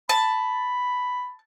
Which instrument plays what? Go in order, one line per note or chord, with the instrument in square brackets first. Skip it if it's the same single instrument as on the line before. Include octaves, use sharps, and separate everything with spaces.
[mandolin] A5 [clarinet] B5